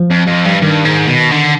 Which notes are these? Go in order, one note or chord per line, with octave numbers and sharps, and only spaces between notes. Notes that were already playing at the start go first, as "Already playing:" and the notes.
Already playing: F3
F2
F2
G2
G2 D#3
G#2
B2
D3